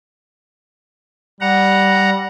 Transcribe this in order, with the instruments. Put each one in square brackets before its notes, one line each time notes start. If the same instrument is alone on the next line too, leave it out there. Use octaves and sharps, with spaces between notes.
[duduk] G3 [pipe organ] F#5 A#5